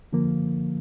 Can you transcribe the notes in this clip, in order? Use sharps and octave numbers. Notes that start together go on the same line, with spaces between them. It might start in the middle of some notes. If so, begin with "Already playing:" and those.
D3 F3 A#3